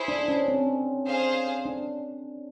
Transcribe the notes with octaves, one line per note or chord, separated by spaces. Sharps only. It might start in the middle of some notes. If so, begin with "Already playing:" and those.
Already playing: E4 G#4 C5
D4
C#4
C4
G#4 C5 F5
D4